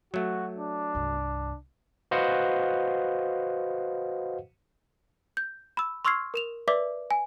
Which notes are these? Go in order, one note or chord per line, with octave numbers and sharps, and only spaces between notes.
F#3 A3 F#4
D4
C2 G2
F#4 B4 C5 D#5 F5 F#5
G6
B5 E6
C6 C#6 E6 F6 G#6 C7
A#4 E7 F7
B4 D5 E5 D6 B6
G#5